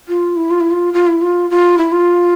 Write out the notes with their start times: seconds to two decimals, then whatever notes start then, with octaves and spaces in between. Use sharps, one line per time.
0.08 F4
0.36 E4
0.51 F4
0.60 E4
0.71 F4
0.94 F4
1.07 E4
1.22 F4
1.50 F4
1.78 E4
1.92 F4